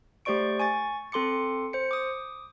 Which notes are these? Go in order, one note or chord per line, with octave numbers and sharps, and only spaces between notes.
A3 G4 C5 D5 C#6 D7
G#5 C#6 A6
C4 A4 C6 D6 C#7
C5 C#7
D6 D#6